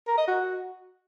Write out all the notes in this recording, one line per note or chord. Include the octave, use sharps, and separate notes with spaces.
A#4
D#5
F#4